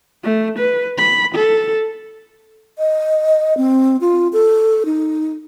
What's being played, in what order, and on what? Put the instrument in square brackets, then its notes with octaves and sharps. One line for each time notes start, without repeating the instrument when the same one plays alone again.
[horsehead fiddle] A3
B4
B5
A4
[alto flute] D#5
C4
F4
A4
D#4